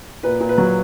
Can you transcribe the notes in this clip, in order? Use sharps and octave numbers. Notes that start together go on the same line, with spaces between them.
A#2 B4
A#2
B4
F#3